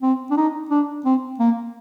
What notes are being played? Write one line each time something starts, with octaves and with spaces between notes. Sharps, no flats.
C4
D4
D#4
D4
C4
A#3